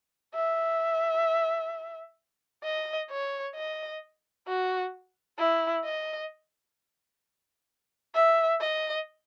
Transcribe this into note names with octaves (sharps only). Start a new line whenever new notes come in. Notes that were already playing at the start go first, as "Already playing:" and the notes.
E5
D#5
C#5
D#5
F#4
E4
D#5
E5
D#5